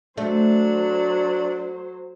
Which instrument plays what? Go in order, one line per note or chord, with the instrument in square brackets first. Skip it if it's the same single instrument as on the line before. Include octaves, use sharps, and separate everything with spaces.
[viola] F#3 C5 [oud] A3 [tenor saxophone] D4